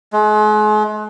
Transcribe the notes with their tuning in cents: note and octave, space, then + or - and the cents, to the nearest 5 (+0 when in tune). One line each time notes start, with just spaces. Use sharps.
G#3 +40